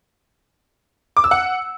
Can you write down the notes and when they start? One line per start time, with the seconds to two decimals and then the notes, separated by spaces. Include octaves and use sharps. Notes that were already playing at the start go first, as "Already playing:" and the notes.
1.17 D6
1.24 E6
1.31 F#5